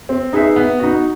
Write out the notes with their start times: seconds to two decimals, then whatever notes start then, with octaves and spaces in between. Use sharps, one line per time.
0.09 C4
0.33 D#4 G#4 B4 E5
0.56 B3
0.80 D#4 F#4